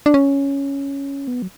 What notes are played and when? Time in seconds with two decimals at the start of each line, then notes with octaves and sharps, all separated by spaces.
0.06 D4
0.14 C#4
1.28 B3
1.42 F#3